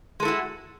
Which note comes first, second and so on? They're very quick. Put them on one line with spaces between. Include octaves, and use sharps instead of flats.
G#3 A4 E4 F#4